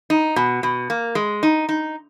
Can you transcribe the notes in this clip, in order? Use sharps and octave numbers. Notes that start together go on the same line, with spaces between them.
D#4
B2
B2
A#3
G#3
D#4
D#4